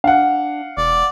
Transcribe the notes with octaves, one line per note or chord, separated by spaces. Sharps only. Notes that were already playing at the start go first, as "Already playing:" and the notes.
D4 F5 F#5
E1 D5